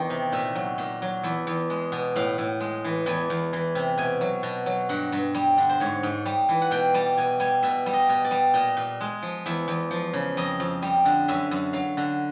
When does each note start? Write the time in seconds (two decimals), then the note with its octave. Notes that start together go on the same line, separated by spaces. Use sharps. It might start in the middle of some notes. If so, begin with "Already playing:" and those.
Already playing: E2 D#3
0.10 C3
0.32 A#2 E5
0.55 F#3
0.78 A#2
1.02 F#3
1.23 E2 E5
1.47 E2
1.70 G#3
1.92 B2
2.16 A2 F5
2.38 A2
2.60 G#3
2.84 E3
3.06 E2 G#5
3.30 E2
3.53 E3
3.75 C3
3.98 B2 G#5
4.21 F#3
4.43 B2
4.66 F#3
4.89 G2 F#5
5.12 G2
5.35 G3
5.58 D3
5.69 C5
5.80 G#2 C#5
6.03 G#2
6.26 G3
6.49 E3
6.62 F#5
6.71 B2 G5
6.94 G3 A5
7.17 B2 G#5
7.40 G3 G#5
7.63 B2 E5
7.86 G3
7.93 D#5
8.09 B2
8.25 D5
8.31 G3
8.54 A#2 D#5
8.77 A#2
9.01 G#3
9.23 F3
9.46 E2 E5
9.68 E2
9.91 F3
10.13 C#3
10.37 F2 D#5
10.60 F2
10.82 G3
11.05 D3
11.28 F#2 E5
11.51 F#2
11.73 F#3 F5
11.97 D3